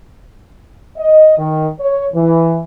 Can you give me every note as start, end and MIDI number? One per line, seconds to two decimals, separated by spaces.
0.97 1.37 75
1.38 1.68 51
1.80 2.05 73
2.14 2.61 52